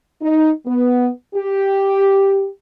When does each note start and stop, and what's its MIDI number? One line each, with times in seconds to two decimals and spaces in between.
0.21 0.50 63
0.65 1.08 59
1.35 2.47 67